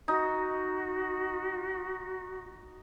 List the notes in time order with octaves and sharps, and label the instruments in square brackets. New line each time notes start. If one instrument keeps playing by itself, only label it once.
[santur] D#4 [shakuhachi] F#4